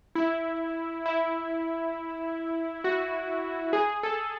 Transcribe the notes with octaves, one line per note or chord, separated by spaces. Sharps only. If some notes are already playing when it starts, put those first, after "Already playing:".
E4
E4
F#4
G#4
A4